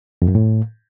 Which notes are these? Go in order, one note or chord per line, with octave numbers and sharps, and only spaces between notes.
F2
F#2
A2